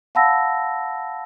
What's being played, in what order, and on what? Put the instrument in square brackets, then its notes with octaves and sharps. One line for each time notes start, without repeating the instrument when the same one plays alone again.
[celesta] F5 F#5 A5 B5 E6 A#6